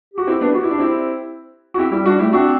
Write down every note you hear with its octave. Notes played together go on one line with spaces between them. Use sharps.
F#4 G4
C4 E4
B3 D4
F#4
E4
D4
C4 E4
F#4
C4 E4 G4
G3 E4 G4
G3 D4 F#4
A3 E4 G4
C4 D4 F#4